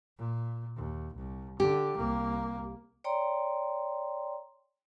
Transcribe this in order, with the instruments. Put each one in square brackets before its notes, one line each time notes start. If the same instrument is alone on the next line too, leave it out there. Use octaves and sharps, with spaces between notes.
[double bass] A#2
D#2
C2
[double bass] D3 [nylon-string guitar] G4
[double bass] C2 A#3
[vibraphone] C#5 D5 G5 A#5 C6